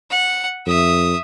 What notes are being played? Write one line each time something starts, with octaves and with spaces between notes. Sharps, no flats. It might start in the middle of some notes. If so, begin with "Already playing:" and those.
F#5
F2 E5 D#6